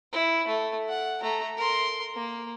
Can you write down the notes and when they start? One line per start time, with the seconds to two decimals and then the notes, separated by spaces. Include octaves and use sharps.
0.12 E4
0.47 A3
0.89 F#5
1.22 A3 A#5
1.57 A#4 C6
2.14 A#3